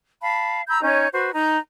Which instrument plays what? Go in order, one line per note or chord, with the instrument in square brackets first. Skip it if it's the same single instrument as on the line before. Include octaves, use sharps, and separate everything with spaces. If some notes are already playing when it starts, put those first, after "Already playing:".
[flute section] F5 A5 B5
A#5 B5 E6 G6
C#4 D#4 C#5 G6
F#4 B4 C5
D#4 A#5